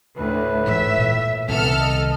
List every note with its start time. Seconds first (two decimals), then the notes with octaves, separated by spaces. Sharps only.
0.17 D2 A2 B4
0.67 G#2 E3 E5
0.97 A#2
1.48 C2 D#3 E3 B3 A4 F6
1.80 D#5